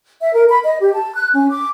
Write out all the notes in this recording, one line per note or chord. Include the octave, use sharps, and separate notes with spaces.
E5
A#4
B5
D#5
G4
A5
F#6
C#4
D6